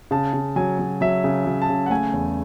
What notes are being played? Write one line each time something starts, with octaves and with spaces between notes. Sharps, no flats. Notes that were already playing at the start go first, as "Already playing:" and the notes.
C#3 A5
C#3
F#3 G#5
F#3
F#3 E5
C#3
F#3
A5
C#3
F#5
A3 G#5
E2